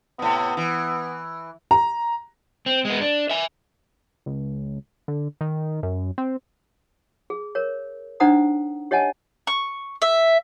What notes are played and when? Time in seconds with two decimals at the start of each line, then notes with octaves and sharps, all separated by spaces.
0.19 A2 C3 B3
0.57 E3
1.71 A#5
2.66 C4
2.85 G#3 B3
3.01 D4
3.30 E5 G#5
4.26 C#2
5.08 D3
5.41 D#3
5.83 F#2
6.18 C4
7.30 G#4
7.55 A#4 C#5
8.20 D4 D#4 C5 F#5 A#5 D#6
8.91 G4 C#5 D#5 F#5 G#5 A5
9.47 C#6
10.02 E5